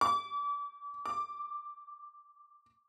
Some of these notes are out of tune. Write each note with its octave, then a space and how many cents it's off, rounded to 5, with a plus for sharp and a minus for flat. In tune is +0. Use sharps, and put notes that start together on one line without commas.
D6 -40
D6 +0